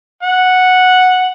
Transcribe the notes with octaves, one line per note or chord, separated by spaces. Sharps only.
F#5